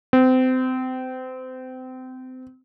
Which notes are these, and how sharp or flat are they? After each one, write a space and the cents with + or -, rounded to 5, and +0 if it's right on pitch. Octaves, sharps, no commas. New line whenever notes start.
C4 -30